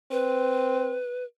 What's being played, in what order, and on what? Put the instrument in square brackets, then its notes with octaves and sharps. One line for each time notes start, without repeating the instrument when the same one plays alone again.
[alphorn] C4 [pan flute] B4